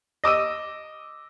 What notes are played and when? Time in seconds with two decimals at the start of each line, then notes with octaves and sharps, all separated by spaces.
0.24 D#5 D6 E6 D#7